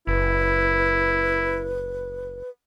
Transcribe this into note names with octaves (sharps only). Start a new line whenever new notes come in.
F#1 E4 B4